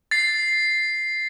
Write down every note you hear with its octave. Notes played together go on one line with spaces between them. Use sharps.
A6 C7